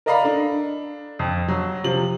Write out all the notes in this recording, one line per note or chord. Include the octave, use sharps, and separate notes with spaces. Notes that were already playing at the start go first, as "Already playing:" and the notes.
A#4 D5 D#5 F5 A#5 B5
D4 A4
F2
F#3
C3 F3 F#7